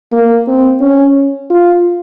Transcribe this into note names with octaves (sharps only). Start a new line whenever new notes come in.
A#3
C4
C#4
F4